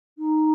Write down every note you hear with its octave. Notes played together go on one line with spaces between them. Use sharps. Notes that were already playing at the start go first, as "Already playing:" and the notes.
D#4